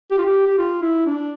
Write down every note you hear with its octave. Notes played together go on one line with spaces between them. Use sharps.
G4
F4
G4
G4
F4
E4
D4